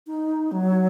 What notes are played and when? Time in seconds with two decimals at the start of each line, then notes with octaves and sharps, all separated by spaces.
0.07 D#4
0.52 F#3